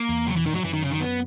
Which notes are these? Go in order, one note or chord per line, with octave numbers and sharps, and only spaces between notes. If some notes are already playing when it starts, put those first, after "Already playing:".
Already playing: A#3
E2
C#3 F#3
B2 E3
A#2 D#3
G#2 F#3
F#2 E3
D#3
C#3
D#3
B3